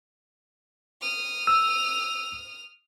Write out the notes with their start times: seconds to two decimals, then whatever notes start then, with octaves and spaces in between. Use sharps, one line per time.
1.02 D#6 F6
1.47 E6